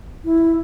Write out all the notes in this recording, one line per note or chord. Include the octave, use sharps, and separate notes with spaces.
E4